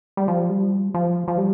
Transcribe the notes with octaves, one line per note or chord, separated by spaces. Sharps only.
G3
F3
G3
F3
F3
G3